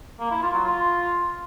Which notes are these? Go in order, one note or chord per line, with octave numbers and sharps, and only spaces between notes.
A#3
E4
F4
F#3
F4